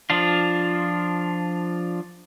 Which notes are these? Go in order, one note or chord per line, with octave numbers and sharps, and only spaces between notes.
F3 D4 F4